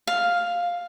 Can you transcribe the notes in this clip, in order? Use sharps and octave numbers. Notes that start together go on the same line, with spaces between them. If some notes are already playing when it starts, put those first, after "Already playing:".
F5